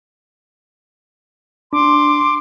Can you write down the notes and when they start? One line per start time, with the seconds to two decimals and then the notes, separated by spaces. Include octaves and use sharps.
1.73 D4 C6 D6